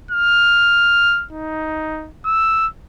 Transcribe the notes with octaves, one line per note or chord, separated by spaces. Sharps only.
F6
D#4
E6